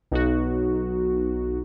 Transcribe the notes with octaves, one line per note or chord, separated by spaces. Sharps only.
B1 D#4 F#4